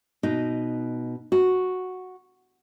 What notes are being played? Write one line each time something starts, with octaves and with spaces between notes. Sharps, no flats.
B2 D#4
F#4